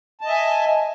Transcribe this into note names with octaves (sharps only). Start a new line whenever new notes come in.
D#5 E5 G#5 A5